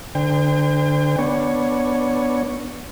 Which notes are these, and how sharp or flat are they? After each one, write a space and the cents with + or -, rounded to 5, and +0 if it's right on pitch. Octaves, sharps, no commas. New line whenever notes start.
D3 +10 C5 -30 G5 +35
B3 -5 D4 +0 C#5 +0